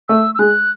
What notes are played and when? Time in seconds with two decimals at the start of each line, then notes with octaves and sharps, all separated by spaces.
0.09 A3 E6
0.35 E6
0.39 G#3 F#6